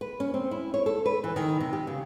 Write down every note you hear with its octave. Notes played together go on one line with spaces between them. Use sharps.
B4
C#4
C4
E4
C#5
A4
B4
E3
D#3
C3
G4
C#3